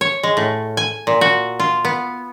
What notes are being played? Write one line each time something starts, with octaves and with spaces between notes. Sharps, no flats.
C#5
G#3
A2
G#5
A#2
F#4
F4
B3